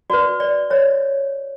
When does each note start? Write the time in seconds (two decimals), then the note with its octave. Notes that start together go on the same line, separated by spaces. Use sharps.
0.10 F#4 B4 D5
0.40 D5
0.70 C#5 E5